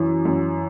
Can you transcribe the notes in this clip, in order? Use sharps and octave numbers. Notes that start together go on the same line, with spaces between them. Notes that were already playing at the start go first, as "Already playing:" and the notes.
Already playing: F#2 E3
F#2